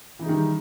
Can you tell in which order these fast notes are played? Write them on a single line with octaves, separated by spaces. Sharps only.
E3 D#4 G#4 D#3 G3